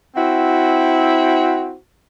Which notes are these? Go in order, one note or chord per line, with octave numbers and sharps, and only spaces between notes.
C4 E4 F#4